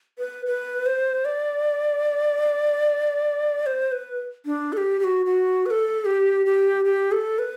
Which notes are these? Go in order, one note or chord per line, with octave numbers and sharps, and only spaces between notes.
B4
B4
C5
D5
C5
B4
D4
A4
G4
G4
F#4
F#4
B4
A4
G4
G4
G4
A4
B4